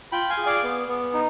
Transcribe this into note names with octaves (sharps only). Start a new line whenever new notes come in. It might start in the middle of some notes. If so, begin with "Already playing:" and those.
F4 G5 B5
F5 G#5
G#4
D5 F5
B3
B3
D#4